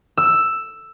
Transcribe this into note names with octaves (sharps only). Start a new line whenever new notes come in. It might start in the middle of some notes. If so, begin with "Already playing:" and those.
E6